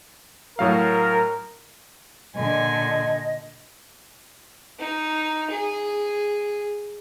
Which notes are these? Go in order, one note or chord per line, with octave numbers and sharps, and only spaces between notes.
A2 F#3 A#4 F5
A#2 D3 D#5 G#5
D#4
G#4